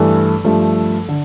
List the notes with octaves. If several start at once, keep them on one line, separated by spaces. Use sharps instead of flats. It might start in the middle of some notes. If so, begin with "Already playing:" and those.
Already playing: G2 E3 A3 A4
G2 F3 A3
D3